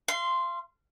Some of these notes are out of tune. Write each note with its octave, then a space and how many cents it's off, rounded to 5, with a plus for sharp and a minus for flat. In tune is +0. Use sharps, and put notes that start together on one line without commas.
F5 -35 C6 +0